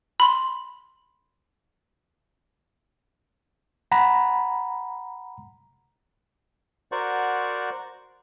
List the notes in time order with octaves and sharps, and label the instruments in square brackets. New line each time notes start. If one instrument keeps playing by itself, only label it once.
[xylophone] B5 C6
[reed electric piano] F#5 A#5 B5
[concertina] F#4 A#4 C5 D5 F#5 C#6